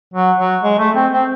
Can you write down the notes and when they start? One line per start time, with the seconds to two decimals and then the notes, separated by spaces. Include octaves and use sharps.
0.14 F#3
0.39 F#3
0.63 G#3
0.78 A3
0.95 C4
1.12 C4